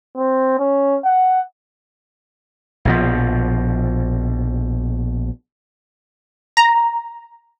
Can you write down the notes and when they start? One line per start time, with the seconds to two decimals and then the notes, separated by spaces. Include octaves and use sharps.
0.17 C4
0.59 C#4
1.04 F#5
2.85 A#1 B2 F3
6.57 A#5